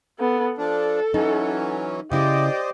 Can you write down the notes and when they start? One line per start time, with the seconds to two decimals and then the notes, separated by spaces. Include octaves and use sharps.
0.19 B3 A4
0.58 F3 D4 A4
1.14 E3 F#3 C#4 D#4
2.12 C#3 E4 G4 C5 D5 D#5